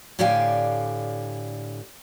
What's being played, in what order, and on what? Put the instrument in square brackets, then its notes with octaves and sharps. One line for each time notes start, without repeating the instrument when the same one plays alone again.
[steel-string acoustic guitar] A2 D3 G4 D5 F5 G#5